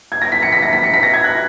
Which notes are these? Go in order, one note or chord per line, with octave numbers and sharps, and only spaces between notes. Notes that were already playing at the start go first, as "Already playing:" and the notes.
G#6
A#6
B6
C#7
B6
A#6
B6
C#7
B6
A#6
G#6
F#6